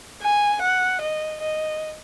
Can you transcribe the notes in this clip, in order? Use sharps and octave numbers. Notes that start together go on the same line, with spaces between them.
G#5
F#5
D#5
D#5